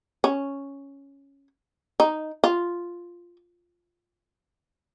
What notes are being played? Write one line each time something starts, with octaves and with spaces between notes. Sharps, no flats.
C#4
D#4
F4